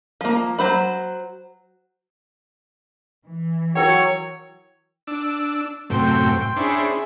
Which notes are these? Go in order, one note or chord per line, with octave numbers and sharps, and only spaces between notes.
F3 A#3
F#3 C5 B5
E3
F#3 E4 A#4 C#5 G5
D4 E6
F#2 A2 C3 G5 C6
C#4 D4 E4 G#4 C5